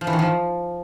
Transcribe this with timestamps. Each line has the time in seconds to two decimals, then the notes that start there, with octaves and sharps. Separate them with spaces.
0.01 F3
0.07 E3
0.13 D#3
0.19 F3